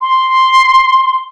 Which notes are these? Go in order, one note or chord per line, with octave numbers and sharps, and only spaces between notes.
C6